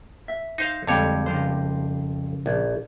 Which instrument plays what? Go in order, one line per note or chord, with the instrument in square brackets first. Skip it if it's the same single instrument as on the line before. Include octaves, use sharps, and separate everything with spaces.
[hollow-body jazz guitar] E5
[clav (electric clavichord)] D#4 C5 F5
[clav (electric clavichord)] F2 G3 C#5 [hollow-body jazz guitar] D3 G#3 C4
[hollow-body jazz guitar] C#3 F3 C5
[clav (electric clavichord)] A#1